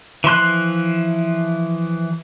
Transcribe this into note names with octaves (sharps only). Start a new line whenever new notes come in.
E3 F3 C6 F#6